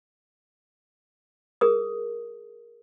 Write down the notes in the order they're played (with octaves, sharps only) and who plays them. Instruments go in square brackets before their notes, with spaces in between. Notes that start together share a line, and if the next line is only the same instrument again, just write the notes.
[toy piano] G#4 A#4 D#6